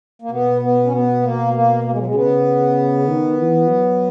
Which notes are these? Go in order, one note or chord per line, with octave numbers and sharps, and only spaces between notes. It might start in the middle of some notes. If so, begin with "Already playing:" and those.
A#3
B2 B3
B3
C#4
B3
A#3
A#3
A#3
G#3
F#3
G#3
C#3 B3
D#3
E3
F#3